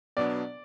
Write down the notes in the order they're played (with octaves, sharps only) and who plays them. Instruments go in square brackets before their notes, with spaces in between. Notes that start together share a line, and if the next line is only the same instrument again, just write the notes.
[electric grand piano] B2 F#3 B3 D4 [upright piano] D5